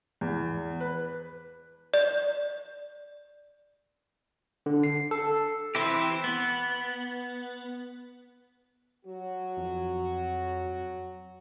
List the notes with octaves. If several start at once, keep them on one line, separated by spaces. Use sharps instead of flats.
E2
B4
D5
D3
C7
A4
E3 C4 E4 G4
B3
F#3 F#4
F2